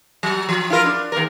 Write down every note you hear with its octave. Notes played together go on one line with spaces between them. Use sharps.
F#3
F3
E4 F4 A#4
D4
D#2 A#4